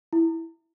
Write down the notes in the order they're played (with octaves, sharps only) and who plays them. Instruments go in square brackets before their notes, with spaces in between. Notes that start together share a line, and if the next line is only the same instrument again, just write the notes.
[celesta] E4